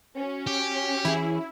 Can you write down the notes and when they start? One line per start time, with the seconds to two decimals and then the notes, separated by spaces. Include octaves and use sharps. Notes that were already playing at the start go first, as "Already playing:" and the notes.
0.17 C#4 F#4
0.47 G4
1.05 E3 E4 G#4